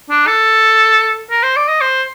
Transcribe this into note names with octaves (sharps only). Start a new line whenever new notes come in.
D4
A4
A#4
C5
D5
D#5
C5